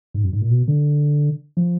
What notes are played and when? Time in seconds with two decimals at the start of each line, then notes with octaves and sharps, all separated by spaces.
0.14 G#2
0.24 F#2
0.33 G#2
0.41 A#2
0.50 B2
0.68 D3
1.57 F3